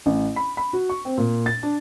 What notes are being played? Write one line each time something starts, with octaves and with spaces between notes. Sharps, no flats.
A1
B5
B5
F#4
C#6
C4
A#2
A6
D4